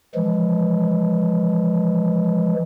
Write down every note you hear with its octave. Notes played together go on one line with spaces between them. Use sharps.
E3 F3 G#3